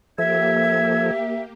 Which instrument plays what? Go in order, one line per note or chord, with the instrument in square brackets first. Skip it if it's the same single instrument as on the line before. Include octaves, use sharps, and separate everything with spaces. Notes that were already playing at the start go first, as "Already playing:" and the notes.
[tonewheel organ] F3 A4 [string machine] A#3 G4 [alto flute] E5 [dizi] G#6